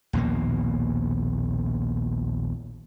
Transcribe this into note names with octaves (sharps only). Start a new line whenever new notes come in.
A#1 D#2 B2 A#3